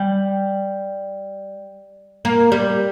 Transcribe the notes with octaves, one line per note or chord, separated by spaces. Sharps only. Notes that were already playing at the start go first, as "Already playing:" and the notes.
Already playing: G3
A#3
G3